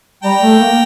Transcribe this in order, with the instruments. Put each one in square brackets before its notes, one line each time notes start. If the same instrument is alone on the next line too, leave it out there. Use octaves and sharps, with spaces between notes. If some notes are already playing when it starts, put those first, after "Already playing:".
[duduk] G3 [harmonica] G5 A#5
[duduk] A3
A#3